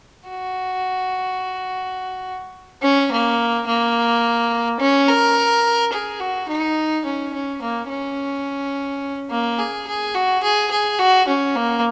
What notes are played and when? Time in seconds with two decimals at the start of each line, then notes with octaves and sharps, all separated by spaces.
0.29 F#4
2.82 C#4
3.11 A#3
3.67 A#3
4.80 C#4
5.08 A#4
5.93 G#4
6.20 F#4
6.49 D#4
7.05 C#4
7.34 C#4
7.62 A#3
7.89 C#4
9.31 A#3
9.59 G#4
9.87 G#4
10.15 F#4
10.43 G#4
10.71 G#4
10.99 F#4
11.28 C#4
11.56 A#3